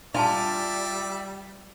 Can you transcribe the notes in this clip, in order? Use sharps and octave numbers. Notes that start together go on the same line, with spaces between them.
G3 D4 F4 D5 E5 G#5 A5